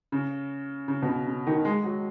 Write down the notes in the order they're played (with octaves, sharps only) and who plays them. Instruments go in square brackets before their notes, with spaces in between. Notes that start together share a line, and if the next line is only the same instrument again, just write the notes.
[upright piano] C#3
C#3
B2
C#3
C#3
D#3
G#3
F#3